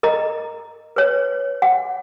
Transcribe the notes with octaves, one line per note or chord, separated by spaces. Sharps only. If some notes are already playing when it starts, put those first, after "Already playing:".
A#4 D#5 A#5
B4 C#5
F#5